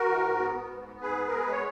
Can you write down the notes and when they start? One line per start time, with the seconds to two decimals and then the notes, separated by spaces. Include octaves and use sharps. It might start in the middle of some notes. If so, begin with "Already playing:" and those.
Already playing: F#4 A#4
0.09 E3
0.25 G#2
0.39 B3
0.55 B3
0.71 G#2
0.86 B3
1.01 G#2 G#4 B4
1.17 B3
1.28 B3 A#4
1.39 B4
1.47 G#3 C#5